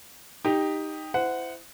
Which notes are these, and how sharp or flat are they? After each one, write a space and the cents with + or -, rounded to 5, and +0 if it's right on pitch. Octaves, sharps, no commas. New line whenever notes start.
D#4 +0 G4 +10
E4 +5 C5 -30 F#5 +0